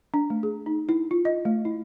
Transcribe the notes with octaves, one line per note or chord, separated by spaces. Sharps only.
D4
A3
G#4
D#4
E4
F4
D#5
A3
E4